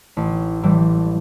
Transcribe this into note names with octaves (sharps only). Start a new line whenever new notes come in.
A1
A2 E3 G3